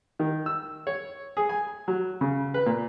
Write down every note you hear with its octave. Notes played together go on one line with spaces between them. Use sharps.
D#3
E6
C#5
G#4
G#5
F#3
C#3
B4
A#2